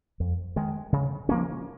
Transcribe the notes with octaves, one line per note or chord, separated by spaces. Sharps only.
F2
D#3 G#3
C#3
F3 A#3 C#4